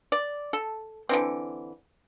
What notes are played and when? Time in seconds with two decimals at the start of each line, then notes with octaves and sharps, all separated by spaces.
0.12 D5
0.53 A4
1.09 D3 E3 C4